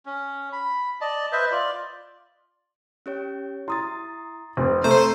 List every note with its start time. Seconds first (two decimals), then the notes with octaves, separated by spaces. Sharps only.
0.06 C#4
0.53 B5
1.01 D5 D#5 A5
1.32 B4 C5 D#5 E5
1.52 F4 D5
3.06 C#4 G4 C#5
3.68 E4 A#5 C6 D#6 A6
4.57 F1 C4
4.84 A3 C5 A#5 E6